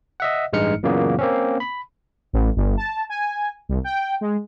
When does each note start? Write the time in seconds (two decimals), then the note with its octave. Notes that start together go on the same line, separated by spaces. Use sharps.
0.20 D#5 E5 F#5
0.53 A1 G2 G#3 D#4 F6 C#7
0.83 F#2 A#2 C#3 E3 A#3 B3
1.19 A#3 C4 C#4
1.60 B5
2.33 A1
2.56 G1
2.77 A5
3.09 G#5
3.69 C2
3.84 G5
4.21 G#3